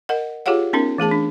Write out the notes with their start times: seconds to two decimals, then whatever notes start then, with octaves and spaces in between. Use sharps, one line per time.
0.09 A#4 D#5 F#5
0.46 F4 G4 G#4 C#5 F5 F#5
0.73 B3 C#4 D#4 A#4
0.98 E3 A3 G#4 A5
1.11 D4